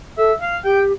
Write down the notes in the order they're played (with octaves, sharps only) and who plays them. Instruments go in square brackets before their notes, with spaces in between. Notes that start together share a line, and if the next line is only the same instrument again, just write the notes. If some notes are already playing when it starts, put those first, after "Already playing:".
[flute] A4 [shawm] E5
[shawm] F5
[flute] G4 [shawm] G5